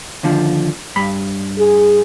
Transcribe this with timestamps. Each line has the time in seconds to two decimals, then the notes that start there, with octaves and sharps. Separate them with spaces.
0.23 D#2 D3 F3
0.96 G2 B5
1.58 G#4